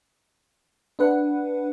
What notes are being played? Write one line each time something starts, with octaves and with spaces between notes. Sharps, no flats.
D4 B4 F#5